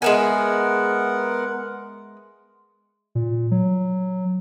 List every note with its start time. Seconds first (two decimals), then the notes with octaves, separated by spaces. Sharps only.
0.02 G#3 B3 A#4 E5 F#5 G#5
3.15 A#2
3.51 F#3